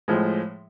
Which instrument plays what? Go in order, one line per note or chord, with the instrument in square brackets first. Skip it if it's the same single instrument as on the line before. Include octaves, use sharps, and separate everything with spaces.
[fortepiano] A2 F3 G#3